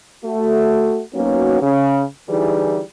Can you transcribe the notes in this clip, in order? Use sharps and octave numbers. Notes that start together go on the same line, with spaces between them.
A3 F#4
F#3 A#3 B3 C#4 D#4 F#4
C#3
D3 E3 G3 D#4 E4 G#4